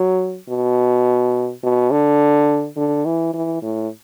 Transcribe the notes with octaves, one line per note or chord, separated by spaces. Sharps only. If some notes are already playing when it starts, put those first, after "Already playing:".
Already playing: F#3
B2
B2
D3
D3
E3
E3
A2